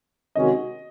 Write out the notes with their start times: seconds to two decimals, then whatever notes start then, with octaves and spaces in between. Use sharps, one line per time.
0.35 C3 D#3 G#3 C#4 F#4 D#5